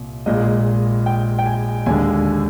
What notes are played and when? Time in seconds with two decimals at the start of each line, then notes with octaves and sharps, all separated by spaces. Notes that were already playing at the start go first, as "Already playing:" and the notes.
Already playing: C2 A#2
0.26 A#1 A#2 G#3 D#5
1.06 G5
1.39 G5
1.46 G#5
1.86 D#2 D3 G#3 G#5